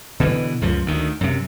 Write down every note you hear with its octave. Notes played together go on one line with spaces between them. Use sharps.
B2 D3 E3
C#2 F#2 F3
D2 D#3
F#2 C3